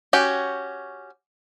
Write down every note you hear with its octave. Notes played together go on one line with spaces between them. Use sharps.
C#4 F#4 G4